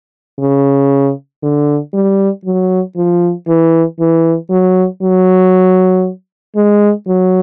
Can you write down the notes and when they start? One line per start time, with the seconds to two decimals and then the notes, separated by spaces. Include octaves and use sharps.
0.39 C#3
1.43 D3
1.93 G3
2.45 F#3
2.96 F3
3.47 E3
3.99 E3
4.50 F#3
5.02 F#3
6.56 G#3
7.07 F#3